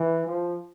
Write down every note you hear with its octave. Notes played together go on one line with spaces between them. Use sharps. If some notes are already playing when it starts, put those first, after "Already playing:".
Already playing: E3
F3